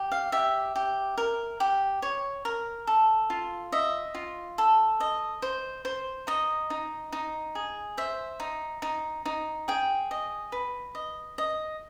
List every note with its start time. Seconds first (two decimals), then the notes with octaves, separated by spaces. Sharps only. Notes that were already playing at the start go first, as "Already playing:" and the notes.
Already playing: G4
0.12 F5
0.32 G4 E5
0.76 G4
1.18 A#4
1.60 G4
2.02 C#5
2.45 A#4
2.87 A4
3.30 F4
3.72 D#5 E5
4.15 F4
4.58 A4
5.00 D#5
5.42 C5
5.85 C5
6.27 D#4 D#5
6.70 D#4
7.12 D#4
7.55 G#4
7.97 C5 E5
8.40 D#4
8.82 D#4
9.25 D#4
9.68 G#4 G5
10.11 D#5
10.52 B4
10.95 D#5
11.38 D#5